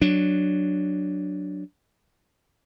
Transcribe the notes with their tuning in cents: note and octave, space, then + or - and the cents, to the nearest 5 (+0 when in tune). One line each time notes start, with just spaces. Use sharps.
F#3 +0 D4 +0